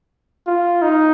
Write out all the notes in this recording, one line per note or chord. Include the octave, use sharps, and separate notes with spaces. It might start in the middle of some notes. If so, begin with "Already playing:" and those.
F4
D#4